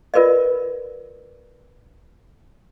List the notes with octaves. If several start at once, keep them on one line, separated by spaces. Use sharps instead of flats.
F4 A#4 B4 D5 D#5